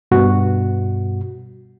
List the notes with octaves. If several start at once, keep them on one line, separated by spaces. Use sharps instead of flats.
G2 B2 F#4